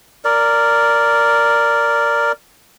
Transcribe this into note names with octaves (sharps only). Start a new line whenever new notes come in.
A#4 D5